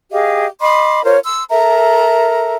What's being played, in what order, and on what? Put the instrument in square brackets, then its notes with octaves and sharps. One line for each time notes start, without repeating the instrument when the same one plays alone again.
[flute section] G4 G#4 D#5 F5
D#5 B5 C6 D6
F4 A#4 C5 C#5
C6 E6
A4 A#4 E5 A#5